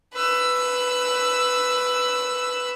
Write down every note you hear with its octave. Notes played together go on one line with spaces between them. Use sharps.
B4 E6